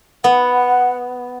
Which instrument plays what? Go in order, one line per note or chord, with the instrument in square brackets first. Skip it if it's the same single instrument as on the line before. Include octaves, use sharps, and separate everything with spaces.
[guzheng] B3 [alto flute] F#5